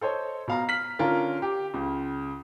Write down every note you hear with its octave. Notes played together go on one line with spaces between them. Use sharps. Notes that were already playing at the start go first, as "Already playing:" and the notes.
A4 C5 C#5 D#5
B2 F5 A#5
F6 B6 F#7
D3 C#4 F4 A#4
G4
C#2 C#3